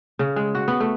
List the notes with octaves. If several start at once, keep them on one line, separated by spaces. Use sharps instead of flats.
C#3
G#3
F#4
B3
A3